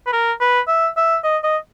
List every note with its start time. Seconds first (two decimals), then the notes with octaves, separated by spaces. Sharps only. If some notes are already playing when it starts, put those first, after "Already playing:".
0.07 B4
0.13 A#4
0.41 B4
0.68 E5
0.97 E5
1.24 D#5
1.44 D#5